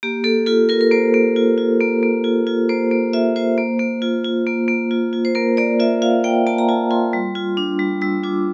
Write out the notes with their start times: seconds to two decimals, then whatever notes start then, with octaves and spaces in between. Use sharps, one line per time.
0.03 A#3 G4
0.24 A#3 A4
0.46 F4 A4
0.69 F4 A#4
0.81 A#4
0.91 A#3 C5
1.14 A#3
1.36 F4
1.58 F4
1.80 A#3
2.03 A#3
2.24 F4
2.47 F4
2.69 A#3 C5
2.91 A#3
3.13 F4 E5
3.36 F4 C5
3.58 A#3
3.79 A#3
4.02 F4
4.24 F4
4.47 A#3
4.68 A#3
4.91 F4
5.13 F4
5.25 C5
5.35 A#3 A#4
5.57 A#3 D5
5.80 F4 E5
6.02 F4 F5
6.24 A#3 G5
6.47 A#3 A5
6.58 A#5
6.68 F4 A5
6.91 F4 C6
7.13 G3
7.35 F4
7.57 D4
7.79 G3
8.02 G3 E6
8.24 F4 D6